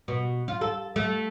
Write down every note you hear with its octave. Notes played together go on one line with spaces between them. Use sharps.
B2
F4
A4
A3